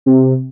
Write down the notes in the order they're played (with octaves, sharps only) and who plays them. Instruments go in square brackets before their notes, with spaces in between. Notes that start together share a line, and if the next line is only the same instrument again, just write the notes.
[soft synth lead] C3